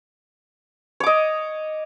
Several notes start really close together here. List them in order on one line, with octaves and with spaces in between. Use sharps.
C#5 D6 D#5